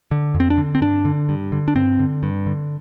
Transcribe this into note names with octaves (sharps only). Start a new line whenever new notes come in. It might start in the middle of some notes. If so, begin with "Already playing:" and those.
D3
F2
C4
D4
D3
C4
G2 D4
D3
G2
D3
D4
G2 C4
D3
G2
D3